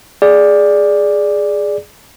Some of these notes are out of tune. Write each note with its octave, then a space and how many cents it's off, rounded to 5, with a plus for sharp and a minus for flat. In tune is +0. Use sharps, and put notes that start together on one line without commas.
G#4 +0 D5 +0